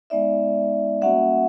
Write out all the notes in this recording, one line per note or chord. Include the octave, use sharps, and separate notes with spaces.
G#3 B3 D#4 D5 E5
G3 A#3 C#4 F#4 E5 F#5